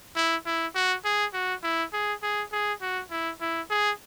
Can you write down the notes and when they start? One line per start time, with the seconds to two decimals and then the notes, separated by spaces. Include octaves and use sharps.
0.15 E4
0.46 E4
0.75 F#4
1.05 G#4
1.34 F#4
1.63 E4
1.93 G#4
2.23 G#4
2.52 G#4
2.81 F#4
3.11 E4
3.41 E4
3.70 G#4